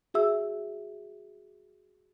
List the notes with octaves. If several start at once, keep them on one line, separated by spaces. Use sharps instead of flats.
F#4 G#4 E5 E6